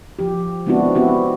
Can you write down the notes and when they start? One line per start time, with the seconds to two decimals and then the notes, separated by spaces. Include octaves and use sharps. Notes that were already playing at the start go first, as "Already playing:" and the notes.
0.19 F3 G4
0.66 G#3 B3 C4 D4 E4 F#4
0.95 B3 C4 E4 F#4 G4